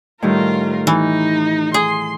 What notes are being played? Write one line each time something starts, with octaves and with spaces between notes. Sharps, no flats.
A2 D#3 G3 F4 A#4
E3 D#4
G#4 C6